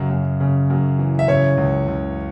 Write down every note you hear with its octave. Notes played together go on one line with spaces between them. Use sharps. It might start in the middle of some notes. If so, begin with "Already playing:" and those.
Already playing: F#2 C#3
F#2
C#3
F#2
E3
E5
C#3 C#5
C#2
C#2